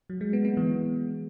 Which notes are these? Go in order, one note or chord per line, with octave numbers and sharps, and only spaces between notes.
F#3
G#3
B3
B3
E3